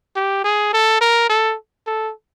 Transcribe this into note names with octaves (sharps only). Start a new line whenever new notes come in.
G4
G#4
A4
A#4
A4
A4